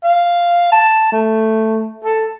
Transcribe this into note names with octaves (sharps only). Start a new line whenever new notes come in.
F5
A5
A3
A4